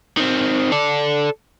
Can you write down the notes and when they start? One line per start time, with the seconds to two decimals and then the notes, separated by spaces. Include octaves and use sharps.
0.17 D#3 C4
0.72 A4 D5